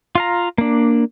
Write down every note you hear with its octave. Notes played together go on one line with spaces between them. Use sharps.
F4 F5 A#5
A#3 D4